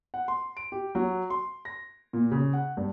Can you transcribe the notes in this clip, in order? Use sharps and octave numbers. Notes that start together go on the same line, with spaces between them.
F#5
C6
D7
G4
F#3
C6
A#6
A#2
C#3
F#5
G2